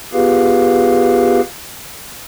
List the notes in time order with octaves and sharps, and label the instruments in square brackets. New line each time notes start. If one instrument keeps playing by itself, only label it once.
[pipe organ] B3 F4 G4 G#4 B4 F5